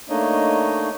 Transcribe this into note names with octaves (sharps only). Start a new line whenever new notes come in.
A3 A#3 D4 D#4 C#5 D#5